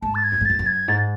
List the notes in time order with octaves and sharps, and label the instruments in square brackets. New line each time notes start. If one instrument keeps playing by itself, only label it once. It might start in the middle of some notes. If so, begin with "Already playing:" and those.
[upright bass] G#2 [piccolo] A5
[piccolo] A6
G#6
[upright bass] F#2
G#2
[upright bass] F#2 [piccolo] A6
[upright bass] F#2
[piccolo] G#6
[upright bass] G#2 [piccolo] A6